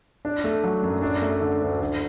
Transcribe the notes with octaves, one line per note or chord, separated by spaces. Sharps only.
D4
A3
F#3
F#2
D4
A3
D3
D2
D3